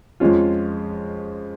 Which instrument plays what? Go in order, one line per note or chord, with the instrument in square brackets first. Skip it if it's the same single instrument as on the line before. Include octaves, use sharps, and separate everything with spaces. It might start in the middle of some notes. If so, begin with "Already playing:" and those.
[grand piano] F2 F3 G#3 C#4 F4